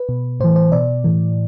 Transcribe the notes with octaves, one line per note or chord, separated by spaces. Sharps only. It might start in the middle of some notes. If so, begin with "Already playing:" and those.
Already playing: B4
B2
A2 E3 C5
C5
B2 D5
A2 E3